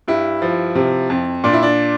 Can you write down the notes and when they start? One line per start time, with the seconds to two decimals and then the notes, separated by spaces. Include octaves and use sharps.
0.08 G2 E4
0.42 F3
0.75 C3
1.10 F2
1.44 A#2 D4
1.53 E4
1.63 D4